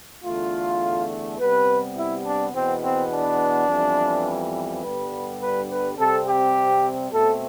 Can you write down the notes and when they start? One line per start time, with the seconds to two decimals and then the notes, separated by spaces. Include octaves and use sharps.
0.24 E2 D3 A3 F4
1.39 C3 G3 B3 B4
1.97 E4
2.25 D4
2.53 E2 B2 B3 C4
2.83 C4
3.11 D4
3.68 F2 E3 G3 B3
4.83 G2 D3 G3 B3 B4
5.40 B4
5.69 B4
5.97 C3 G3 C4 A4
6.27 G4
7.12 B2 A3 C4 A4